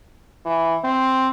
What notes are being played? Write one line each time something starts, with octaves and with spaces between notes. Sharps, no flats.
E3
C4